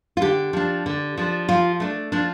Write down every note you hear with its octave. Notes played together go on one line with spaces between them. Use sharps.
F4
D3 G4
F3 D4
D3
F3 D4
F3 F4
A3 D4
F3 D4